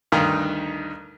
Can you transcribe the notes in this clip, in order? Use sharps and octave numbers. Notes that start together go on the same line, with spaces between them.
D2 G2 D#3 D#4 A#5